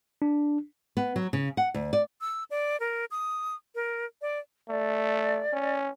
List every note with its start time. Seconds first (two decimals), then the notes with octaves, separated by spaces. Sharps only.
0.22 D4
0.97 B3
1.16 F#3
1.33 C#3
1.57 F#5
1.74 D2
1.93 D5
2.21 E6
2.51 D5
2.80 A#4
3.11 D#6
3.75 A#4
4.22 D5
4.69 A3 D5
5.53 C#4